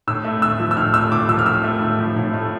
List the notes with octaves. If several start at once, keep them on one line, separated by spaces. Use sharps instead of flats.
A2 E6
A3
A2 E6
F3
E6
A2 F6
A3 E6
A2 D6
F3 E6
F6
A2 E6
A3
A2
F3
A2
A3